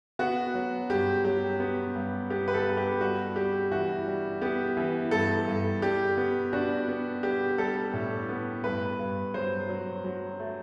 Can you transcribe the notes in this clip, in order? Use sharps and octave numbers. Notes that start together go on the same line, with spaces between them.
B3 F#4
F#3
G2 G4
F#3 G4
B3
G2
B3 G4
B4
A4
G2
G4
G3 F#4
G3 G4
E3 F#4
G3
B3 G4
E3
G2 A4
G2
G3 G4
B3
D4 F#4
B3
G3 G4
G3 A4
A2
B3
G2 B4
G2
F#3 C5
F#3
F#3
A3